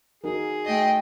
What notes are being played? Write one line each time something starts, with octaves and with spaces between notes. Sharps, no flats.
D#4 F#4 G#4 A#4
A3 D#5 G5